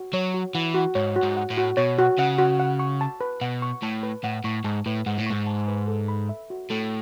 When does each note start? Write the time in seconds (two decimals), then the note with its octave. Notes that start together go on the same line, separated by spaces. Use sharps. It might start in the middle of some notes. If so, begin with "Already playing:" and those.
Already playing: F#4
0.13 F#3 C#5
0.34 F#4
0.55 E3 F#5
0.75 F#4
0.95 G#2 C#5
1.16 F#4
1.23 G#2
1.37 F#5
1.50 A2
1.57 F#4
1.77 B2 C#5
1.98 F#4
2.19 C#3 F#5
2.38 F#4
2.60 F#5
2.79 C#6
3.01 A5
3.21 B4
3.41 B2 F#5
3.62 C#6
3.83 A2 A5
4.03 B4
4.24 A2 F#5
4.44 A2 C#6
4.64 G#2 A5
4.86 A2 B4
5.06 G#2 F#5
5.18 A2
5.26 G#2 C#6
5.47 A5
5.68 B4
5.88 A4
6.08 B5
6.29 E5
6.50 F#4
6.70 A2 A4